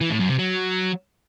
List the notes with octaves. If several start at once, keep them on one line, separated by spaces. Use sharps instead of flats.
E3
A2
F#2
C3
F#3